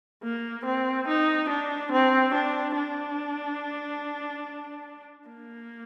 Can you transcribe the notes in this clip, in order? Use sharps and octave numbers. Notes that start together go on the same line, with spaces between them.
A#3
C4
D#4
D4
C4
D4
D4
A#3